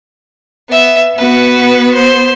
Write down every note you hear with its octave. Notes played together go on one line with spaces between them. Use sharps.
B3 E5
B3 F#4 B4
C5